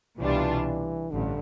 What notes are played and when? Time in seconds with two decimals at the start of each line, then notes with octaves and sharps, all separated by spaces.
0.19 C2 B2 E3 G3 D4 F4
1.11 A1 G2 D3